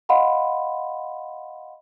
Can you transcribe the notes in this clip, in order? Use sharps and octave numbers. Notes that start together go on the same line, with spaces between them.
D#5 F5 F#5 B5 C6